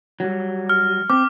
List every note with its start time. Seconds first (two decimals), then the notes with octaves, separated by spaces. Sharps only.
0.20 F#3 G3
0.69 F6
1.10 C4 D6